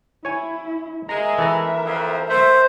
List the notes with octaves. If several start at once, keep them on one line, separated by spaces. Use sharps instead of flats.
E4 C#5 G#5
G#3 A#4 E5 A#5
E3 A4 A#5
F2
A3 C5